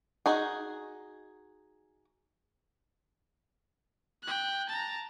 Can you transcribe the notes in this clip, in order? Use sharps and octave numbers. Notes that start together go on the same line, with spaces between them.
D#4 F#4 G#4
G5 F#6
A5 A#5